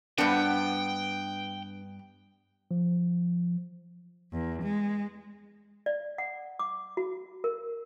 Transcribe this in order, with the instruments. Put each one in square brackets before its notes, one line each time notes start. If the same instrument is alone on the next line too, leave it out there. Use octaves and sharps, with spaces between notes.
[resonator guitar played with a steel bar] G2 B3 [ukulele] D4 C5 F#5 [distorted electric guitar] G5
[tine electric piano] F3
[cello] E2
G#3
[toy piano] D5
F#5
D6
F#4
A#4